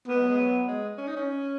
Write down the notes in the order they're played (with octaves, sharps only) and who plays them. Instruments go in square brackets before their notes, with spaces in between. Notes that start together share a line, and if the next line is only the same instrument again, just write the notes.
[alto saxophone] A#3 [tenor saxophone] B3
[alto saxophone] G#3
F#3
G#3
F#3
G#3
C#4
D#4
C#4